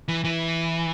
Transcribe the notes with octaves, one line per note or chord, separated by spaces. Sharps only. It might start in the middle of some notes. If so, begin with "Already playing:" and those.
E3
E3